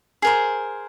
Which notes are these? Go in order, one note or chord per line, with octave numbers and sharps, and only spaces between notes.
G#4 A#4 C5